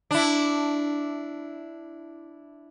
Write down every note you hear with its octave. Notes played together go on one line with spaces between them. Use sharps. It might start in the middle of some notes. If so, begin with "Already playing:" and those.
D4 E4